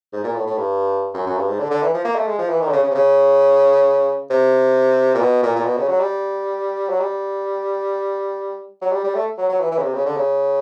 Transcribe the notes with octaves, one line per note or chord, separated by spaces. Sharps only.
G#2
A#2
A2
A2
G2
F#2
F#2
G2
G#2
D3
D3
E3
F3
A#3
A3
G#3
F3
E3
D#3
D3
C#3
C#3
C3
C#3
C3
A#2
B2
A#2
A#2
B2
C#3
F#3
G3
F#3
G3
F#3
G3
G3
A3
F#3
F#3
E3
E3
C#3
C3
C#3
D3
C#3